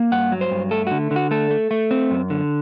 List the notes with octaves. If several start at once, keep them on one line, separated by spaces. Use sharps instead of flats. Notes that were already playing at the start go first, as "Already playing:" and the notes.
Already playing: A#3
G2 F#5
F#3
C5
G2
A3 A4
D3 F#4
D3
F#4
A3 A4
A3
A3
C4
F#2
D3